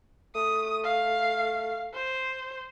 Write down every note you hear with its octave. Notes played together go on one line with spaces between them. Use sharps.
A3 D#6
F5
C5